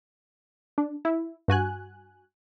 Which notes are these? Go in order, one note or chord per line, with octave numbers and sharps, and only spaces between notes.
D4
E4
G2 F#4 G#5 F#6